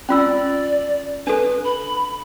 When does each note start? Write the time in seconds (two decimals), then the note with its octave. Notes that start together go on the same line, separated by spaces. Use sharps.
0.09 C#4 F4 D5 E6
1.27 D4 A4 B4
1.64 B5